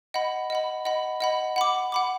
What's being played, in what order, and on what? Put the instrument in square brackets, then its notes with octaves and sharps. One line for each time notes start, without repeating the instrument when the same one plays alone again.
[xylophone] D#5 F#5 B5
D#5 F#5 B5
D#5 F#5 B5
D#5 F#5 B5
F#5 B5 D6
F#5 B5 D6